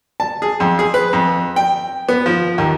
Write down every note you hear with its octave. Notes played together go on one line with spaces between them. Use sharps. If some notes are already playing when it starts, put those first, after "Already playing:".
A5
G#4
F2
G#4
B4
F2
G5
B3
F3
D#2